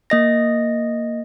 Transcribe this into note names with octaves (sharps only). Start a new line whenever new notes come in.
A#3 D#5 A#6